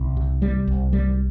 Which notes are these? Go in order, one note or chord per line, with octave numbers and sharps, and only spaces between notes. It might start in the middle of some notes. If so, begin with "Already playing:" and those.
Already playing: C2
C3
G3
C2
G3